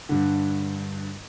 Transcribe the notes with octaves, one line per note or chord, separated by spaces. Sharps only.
G2 D3